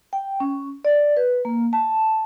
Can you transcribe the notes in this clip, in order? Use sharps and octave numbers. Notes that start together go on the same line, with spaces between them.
G5
C#4
D5
B4
A#3
A5